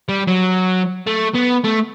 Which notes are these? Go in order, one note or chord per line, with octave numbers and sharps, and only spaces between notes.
G3
F#3
A3
B3
A3